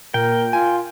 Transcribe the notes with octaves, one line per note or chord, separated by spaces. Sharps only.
A#2 A#4 G5
F4 G#5